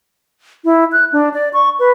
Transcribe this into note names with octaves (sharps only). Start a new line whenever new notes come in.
E4
F#6
D4
D5
C#6
B4